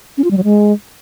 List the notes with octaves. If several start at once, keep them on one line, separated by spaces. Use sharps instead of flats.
C#4
F4
G3
F#3
G#3